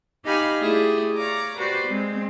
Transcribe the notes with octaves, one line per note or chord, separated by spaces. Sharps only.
D#4 G4 D#5 F5 G#5 B5
A3 E4 G4 G#4 D5 D#5
C#5 D5 F5 A#5 D6
F#4 G4 B4 C5 D5
G#3 C4